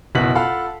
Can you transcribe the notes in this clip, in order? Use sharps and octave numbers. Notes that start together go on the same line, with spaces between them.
F#1 B2 E4 F#4 B6 F#7
F4 A4 F5 F#5 B5